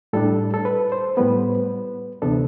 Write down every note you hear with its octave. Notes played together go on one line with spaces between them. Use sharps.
A2 G3 D4 A4
A4
B4
C5
A2 G3 B3 B4
D2 C3 E3 B3 D4 A4